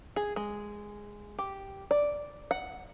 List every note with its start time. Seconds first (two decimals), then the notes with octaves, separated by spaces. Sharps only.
0.16 G#4
0.36 G#3
1.39 G4
1.91 D5
2.51 F#5